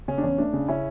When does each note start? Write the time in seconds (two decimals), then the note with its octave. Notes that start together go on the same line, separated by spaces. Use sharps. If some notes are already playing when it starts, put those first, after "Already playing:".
0.08 C#3 C#4
0.18 D4
0.22 E2 C#4
0.38 A3 D4
0.53 C#3
0.68 C#3 C#4 E4